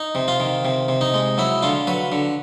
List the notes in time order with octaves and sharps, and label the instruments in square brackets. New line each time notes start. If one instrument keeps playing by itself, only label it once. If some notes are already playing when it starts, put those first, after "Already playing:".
Already playing: [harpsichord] D#4
C3
F4
D#3
C3
C3
D#4
G#3
F#3 E4
D3 F4
F#3 B4
D3